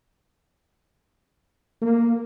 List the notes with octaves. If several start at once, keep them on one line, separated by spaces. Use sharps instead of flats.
A#3